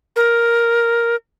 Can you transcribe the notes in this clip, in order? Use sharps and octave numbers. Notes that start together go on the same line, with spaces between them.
A#4